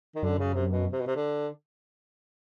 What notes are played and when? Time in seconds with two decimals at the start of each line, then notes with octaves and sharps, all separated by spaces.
0.15 D#3
0.23 F#2 D3
0.39 C#3
0.54 C3
0.70 B2
0.92 C3
1.00 B2
1.07 C3
1.16 D3